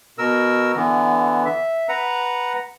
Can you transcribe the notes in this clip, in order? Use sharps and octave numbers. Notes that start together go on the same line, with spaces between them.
B2 A#4 E6
D3 E3 B3
E5
B4 F#5 A#5